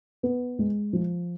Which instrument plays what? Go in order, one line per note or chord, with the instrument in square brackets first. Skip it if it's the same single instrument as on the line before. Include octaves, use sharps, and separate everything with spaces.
[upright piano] B3
G#3
F3